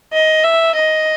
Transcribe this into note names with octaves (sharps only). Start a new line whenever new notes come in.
D#5
E5
D#5